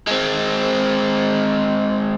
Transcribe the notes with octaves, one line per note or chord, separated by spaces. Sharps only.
G#3 C4